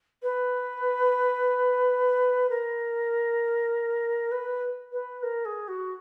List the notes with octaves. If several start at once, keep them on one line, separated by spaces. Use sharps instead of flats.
B4
A#4
B4
B4
A#4
G#4
F#4